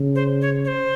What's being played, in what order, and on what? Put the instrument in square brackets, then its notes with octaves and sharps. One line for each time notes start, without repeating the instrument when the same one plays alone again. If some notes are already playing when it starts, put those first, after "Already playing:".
Already playing: [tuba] C#3
[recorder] C5
C#5
C#5
C5